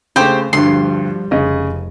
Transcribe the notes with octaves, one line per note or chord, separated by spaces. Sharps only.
C#3 A3 G4 C5
D2 G2 F3 G3 C6
F1 C#3 D#5